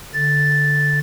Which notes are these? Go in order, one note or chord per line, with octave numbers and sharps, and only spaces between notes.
D3 A6